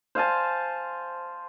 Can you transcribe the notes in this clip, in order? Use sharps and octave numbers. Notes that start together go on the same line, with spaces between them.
C5 F5 G#5 A5